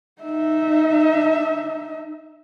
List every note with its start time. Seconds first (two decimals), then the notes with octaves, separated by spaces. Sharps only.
0.22 D#4 E5